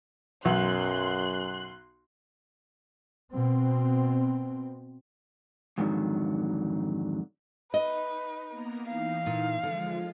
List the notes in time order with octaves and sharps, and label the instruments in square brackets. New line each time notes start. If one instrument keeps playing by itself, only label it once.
[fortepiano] B1 [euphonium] F#2 [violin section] C6 F#6
[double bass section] B2 C4
[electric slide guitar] F2 G#2 D3 D#3 F#3
[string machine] D#4 [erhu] B4 [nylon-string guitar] D#5
[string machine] A#3 B3 A#4
[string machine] E3 D#4 [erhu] F5
[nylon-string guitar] A#2
[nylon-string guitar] D3 [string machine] F3 G#3 F4